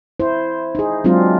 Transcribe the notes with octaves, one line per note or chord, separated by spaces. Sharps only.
E4 C5
D#4 G#4
F#3 G#3 C4 D4 F4